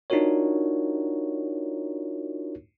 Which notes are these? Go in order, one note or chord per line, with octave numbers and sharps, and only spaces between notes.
D4 D#4 F4 F#4 A#4 C#5